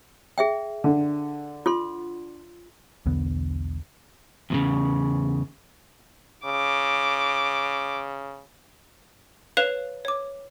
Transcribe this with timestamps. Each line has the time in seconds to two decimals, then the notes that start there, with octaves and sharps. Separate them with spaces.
0.38 G#4 E5 G5
0.84 D3
1.66 F4 A4 C6
3.06 B1 E2 D3 B3
4.50 E2 A#2 C#3
6.45 C#3 D6
9.57 B4 C#5 F5 F#6 E7 F7
10.05 C#5 D6